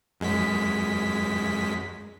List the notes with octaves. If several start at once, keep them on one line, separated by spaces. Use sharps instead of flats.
F#2 G#3 B6